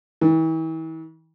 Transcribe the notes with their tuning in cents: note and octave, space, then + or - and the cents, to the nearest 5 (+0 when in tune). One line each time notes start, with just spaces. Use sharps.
E3 -40